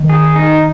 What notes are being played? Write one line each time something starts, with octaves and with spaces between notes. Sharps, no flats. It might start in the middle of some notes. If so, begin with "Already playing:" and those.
Already playing: D#3
G#4
D#4